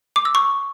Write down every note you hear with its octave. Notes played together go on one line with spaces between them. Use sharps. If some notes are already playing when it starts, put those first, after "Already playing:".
D6
E6
C#6